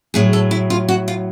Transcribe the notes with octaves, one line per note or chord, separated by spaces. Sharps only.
A2 F#3 G#4
A4
E4
F4
F#4
F4